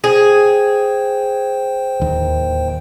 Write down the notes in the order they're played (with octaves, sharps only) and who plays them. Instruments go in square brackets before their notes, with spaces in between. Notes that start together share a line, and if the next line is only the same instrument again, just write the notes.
[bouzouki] G#4 [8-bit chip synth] C5 G5
[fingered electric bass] D1 D#2